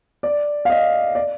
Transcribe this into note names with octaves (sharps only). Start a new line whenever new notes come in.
D5
F5
D#5
D5